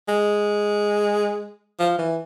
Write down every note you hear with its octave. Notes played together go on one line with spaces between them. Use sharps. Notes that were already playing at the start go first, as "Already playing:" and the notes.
G#3
F3
E3